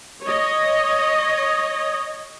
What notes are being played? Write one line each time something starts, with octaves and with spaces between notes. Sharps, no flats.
C#5 D#5